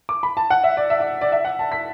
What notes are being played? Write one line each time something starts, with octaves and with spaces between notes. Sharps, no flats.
D6
B5
A5
F#5
E5
D5
E5
D5
D5
E5
F#5
A5
B6